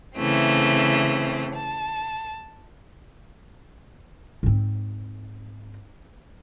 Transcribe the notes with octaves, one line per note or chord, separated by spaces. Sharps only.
C#3 E3 A3 C4
A5
G#2 C4